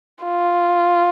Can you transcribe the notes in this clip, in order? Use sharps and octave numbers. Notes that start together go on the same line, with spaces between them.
F4